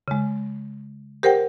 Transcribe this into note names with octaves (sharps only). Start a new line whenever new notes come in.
C#3 G#3
G4 A#4 C5 F#5 G5